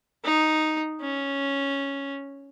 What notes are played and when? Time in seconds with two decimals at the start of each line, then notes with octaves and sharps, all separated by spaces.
0.24 D#4
1.01 C#4